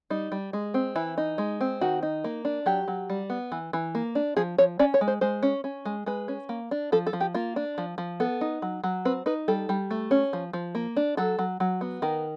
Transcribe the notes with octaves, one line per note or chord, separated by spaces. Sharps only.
G3 D#4
G3
G#3
C4
E3 E4
D#4
G#3
C4
D#3 F#4
D#4
A#3
D4
F#3 G4
F#3
G3
B3
E3
E3
A#3
D4
F3 G#4
F3 C#5
C#4 D5
C#5
G#3
C5
G#3 C5
C#4
C#4
G#3
G#3 B4
C#4
A#3
D4
F3 A4
A4
F3
G4
A#3 F4
D4
F3
F3
B3 A4
D#4
F#3
F#3
C4 B4
D#4 B4
G3 A4
G3
A3
C#4
F3
F3
A#3
D4
F#3 A4
F#3
F#3
B3
D#3 A#4